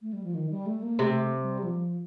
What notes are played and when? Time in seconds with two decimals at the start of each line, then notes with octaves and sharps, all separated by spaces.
0.02 A3
0.13 G3
0.24 F3
0.34 D#3
0.50 G3
0.66 A3
0.82 A#3
0.99 C3 A3
1.42 G3
1.63 F3